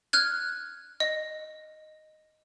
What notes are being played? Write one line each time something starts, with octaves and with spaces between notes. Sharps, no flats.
F6 F#6 G#6
D#5